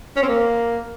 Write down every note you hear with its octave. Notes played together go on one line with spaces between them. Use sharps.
C#4
C4
A#3